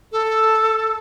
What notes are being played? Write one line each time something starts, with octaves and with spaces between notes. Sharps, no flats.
A4